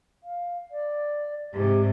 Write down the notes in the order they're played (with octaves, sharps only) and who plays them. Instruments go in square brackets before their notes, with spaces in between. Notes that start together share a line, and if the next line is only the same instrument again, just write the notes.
[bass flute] F5
D5
[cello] G#2 C3 [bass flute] G4